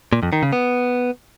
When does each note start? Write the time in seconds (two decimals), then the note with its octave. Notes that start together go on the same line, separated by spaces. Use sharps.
0.13 A#2
0.23 F2
0.33 D#3
0.43 C#3
0.53 B3